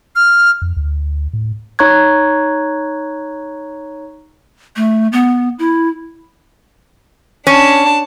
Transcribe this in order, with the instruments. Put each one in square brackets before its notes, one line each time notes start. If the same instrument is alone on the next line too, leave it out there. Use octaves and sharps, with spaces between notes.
[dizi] F6
[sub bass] F2
D2
A2
[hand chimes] D#4 C#5 A#5 C#6 F#6 G#6
[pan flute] A3
B3
E4
[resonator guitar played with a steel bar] C#4 [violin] D4 A5